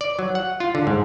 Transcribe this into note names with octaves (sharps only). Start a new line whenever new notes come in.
D5
F#3
F#5
F4
D3
G#2